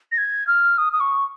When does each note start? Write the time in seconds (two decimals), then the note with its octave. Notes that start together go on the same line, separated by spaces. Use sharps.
0.12 A#6
0.18 G#6
0.47 F6
0.78 D#6
0.93 D#6
1.00 C#6